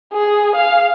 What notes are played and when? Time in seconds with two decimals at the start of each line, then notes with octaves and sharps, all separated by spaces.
0.14 G#4
0.56 F5